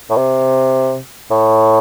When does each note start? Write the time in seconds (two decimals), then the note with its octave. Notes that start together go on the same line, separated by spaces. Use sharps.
0.10 A2
0.16 C3
1.31 A2